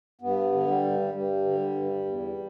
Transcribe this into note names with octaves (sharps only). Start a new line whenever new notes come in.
G2 B3
D3
G3
G2
G2 G3
D3
G2
E2